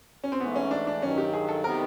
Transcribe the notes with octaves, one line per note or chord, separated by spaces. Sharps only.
C#4
C4
G#2 E3 A3 B3
C#4
D4
D4
G2 D#3 F#3 C#4
G4
G#4
A4
C3 D#3 G3 B3 A#4